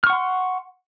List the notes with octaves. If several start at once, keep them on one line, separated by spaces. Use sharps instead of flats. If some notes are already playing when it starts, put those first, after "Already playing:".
F#5 C6 C#6 F6